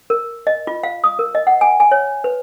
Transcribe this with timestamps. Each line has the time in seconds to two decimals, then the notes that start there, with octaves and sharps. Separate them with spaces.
0.10 A#4
0.47 D#5
0.67 F4
0.83 F5
1.04 D#6
1.19 A#4
1.35 D#5
1.47 F#5
1.61 G#5
1.80 G#5
1.92 C#5
2.24 B4